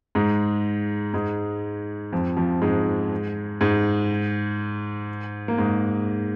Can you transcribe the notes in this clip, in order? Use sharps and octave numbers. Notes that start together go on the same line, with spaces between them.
G#2 G#3
G#2 G#3
F2 F3
F2 F3
G#2 G#3
G#2 G#3
A#3
G#2 G#3